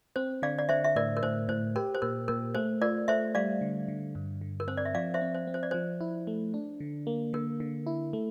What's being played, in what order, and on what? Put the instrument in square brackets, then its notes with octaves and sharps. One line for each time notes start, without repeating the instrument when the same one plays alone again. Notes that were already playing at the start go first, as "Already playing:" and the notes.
[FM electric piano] C4 [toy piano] C5
[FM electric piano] D3 [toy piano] D5 F5
[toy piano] D5
[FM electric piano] D3 [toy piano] C5 E5
[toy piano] E5
[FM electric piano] A2 [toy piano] A#4 D5
[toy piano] A#4
[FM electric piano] A2 [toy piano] C5
[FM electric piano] A2 [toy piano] C5
[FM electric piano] G4 [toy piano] A#4
[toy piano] C5
[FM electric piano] A#2 [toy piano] A#4
[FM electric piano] A#2 [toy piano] A#4
[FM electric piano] A3 [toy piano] C5
[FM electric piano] F4 [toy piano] A#4 D5
[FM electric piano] A3 [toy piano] C5 E5
[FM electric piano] G3 [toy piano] D5 F5
[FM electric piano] D3
D3
G2
D3
[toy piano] A#4
[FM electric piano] C4 [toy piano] C5
[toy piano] D5
E5
[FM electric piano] F3 [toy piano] D5 F5
[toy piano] C5 E5
[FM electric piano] C4
[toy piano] C5
[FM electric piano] C4
[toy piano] C5
D5
[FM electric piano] F3 [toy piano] C5
[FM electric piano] E4
A3
D4
D3
A#3
[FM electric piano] D3 [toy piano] A#4
[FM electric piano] D3
E4
A3